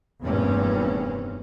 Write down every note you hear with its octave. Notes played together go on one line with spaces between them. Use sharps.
F1 E2 G2 A#2 C4 C#4